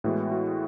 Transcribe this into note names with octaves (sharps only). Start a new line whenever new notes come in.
A2 E3 G#3 B3 F#4
F#4